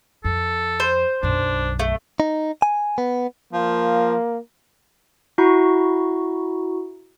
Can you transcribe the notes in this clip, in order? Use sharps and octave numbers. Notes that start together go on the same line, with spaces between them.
F2 A4
C5
B1 F#2 D4
A3
D#4
G#5
B3
F3 A#3
E4 F#4 A#5 C#6